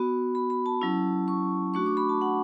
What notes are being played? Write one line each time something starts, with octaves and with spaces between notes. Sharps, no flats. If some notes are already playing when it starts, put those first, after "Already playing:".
Already playing: B3 F#4 B5
B5
B5
A5
F#3 C#4 E4
C#6
A3 D4 F#4 C#6
D6
B5
A5
F#5